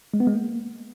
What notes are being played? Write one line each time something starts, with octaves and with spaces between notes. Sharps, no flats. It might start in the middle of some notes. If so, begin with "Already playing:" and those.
G#3
B3
G#3
A#3